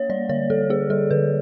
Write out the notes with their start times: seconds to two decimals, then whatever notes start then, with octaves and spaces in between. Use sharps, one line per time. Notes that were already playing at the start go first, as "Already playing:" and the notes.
Already playing: A#3 C#5
0.10 G3 D5
0.29 D3 C#5
0.50 D3 A4
0.70 A#3 G#4
0.90 G3 A4
1.11 D3 B4